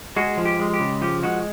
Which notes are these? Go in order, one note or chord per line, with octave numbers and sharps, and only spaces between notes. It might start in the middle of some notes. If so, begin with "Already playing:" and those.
G#3 F#4 G#4
F3
G4
G#3
G4
C#3
F3 G4
G#3 F#4